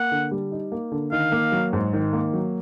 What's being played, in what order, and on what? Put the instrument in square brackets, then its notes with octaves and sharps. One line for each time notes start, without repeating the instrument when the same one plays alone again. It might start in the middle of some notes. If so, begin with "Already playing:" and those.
Already playing: [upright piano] A#3 [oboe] F#5
[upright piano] D3
G3
D#4
A#3
D3
[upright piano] D#3 [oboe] F5
[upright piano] A#3
F#3
G#2
D#3
A#3
F#3